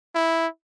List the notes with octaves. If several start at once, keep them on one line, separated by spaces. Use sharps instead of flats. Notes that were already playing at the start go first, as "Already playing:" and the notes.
E4